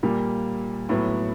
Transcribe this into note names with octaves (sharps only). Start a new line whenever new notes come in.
A#2 G3 A#3
A2 F#3 B3